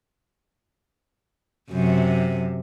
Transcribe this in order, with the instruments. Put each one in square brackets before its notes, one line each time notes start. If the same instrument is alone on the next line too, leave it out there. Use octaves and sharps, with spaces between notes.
[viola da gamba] F#2 C3